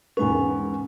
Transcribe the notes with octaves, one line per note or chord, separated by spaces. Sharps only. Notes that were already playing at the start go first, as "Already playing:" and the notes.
E1 G#2 C#4 B4 G#5